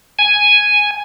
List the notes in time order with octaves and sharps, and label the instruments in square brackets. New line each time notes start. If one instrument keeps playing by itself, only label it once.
[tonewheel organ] G#5